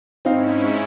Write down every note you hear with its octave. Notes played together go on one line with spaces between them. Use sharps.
G#2 C4 C#4 D#4 E4 F5